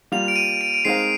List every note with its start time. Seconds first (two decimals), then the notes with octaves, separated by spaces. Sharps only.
0.12 G3 A#3 F4 F7
0.28 D7
0.36 D#7
0.61 D7
0.74 D7
0.85 G#3 C4 D#4 A#4 F5 C7